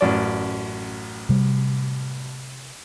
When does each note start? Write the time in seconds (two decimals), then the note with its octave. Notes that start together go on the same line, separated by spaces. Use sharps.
0.01 A1 F#2 D5
1.29 C3 G3